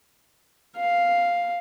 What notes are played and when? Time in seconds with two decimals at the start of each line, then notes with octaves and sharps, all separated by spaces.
0.77 F5